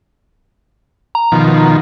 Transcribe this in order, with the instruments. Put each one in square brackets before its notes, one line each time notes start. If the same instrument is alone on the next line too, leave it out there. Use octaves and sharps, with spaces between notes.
[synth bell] A#5
[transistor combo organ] B2 D#3 F3